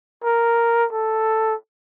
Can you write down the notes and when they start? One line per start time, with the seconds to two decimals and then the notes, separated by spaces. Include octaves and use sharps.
0.24 A#4
0.93 A4